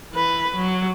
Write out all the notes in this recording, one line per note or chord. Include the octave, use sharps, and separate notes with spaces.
E3 B4
F#3